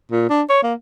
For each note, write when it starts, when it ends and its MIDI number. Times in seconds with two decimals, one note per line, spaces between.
0.11 0.27 46
0.29 0.42 62
0.50 0.61 73
0.63 0.73 58